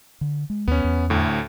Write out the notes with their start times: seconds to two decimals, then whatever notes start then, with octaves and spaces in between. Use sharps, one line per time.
0.21 D3
0.50 G#3
0.68 D#2 B3 C#4
0.84 E2
1.10 D2 A2